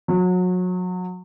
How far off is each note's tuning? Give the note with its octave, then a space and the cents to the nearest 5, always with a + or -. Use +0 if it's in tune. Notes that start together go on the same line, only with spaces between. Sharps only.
F#3 -30